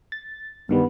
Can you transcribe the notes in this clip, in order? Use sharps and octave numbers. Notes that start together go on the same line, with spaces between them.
A6
G2 D#3 G3 B3